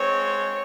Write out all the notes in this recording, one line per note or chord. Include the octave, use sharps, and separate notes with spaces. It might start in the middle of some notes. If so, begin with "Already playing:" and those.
Already playing: G#3 C4 C#5